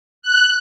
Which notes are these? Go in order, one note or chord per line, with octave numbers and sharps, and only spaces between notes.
F#6